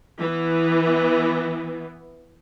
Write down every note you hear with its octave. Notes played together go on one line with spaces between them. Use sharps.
E3 B3